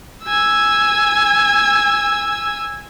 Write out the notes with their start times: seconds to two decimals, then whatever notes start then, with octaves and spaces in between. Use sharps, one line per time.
0.24 G#5 E6